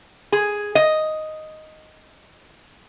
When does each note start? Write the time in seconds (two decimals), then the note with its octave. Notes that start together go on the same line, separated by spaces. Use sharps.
0.32 G#4
0.75 D#5